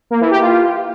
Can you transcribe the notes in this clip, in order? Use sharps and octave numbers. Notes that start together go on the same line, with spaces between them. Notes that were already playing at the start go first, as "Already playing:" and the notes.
A#3
E3
G4
F4